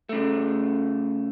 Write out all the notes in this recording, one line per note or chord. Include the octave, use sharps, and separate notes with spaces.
C#3 A3